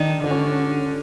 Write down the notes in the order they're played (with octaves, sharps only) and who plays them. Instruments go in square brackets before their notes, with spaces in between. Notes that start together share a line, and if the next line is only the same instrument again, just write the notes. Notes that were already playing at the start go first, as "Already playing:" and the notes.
Already playing: [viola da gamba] D#3 [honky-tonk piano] D4
[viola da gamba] D3 [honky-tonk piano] D4
[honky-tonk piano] C#4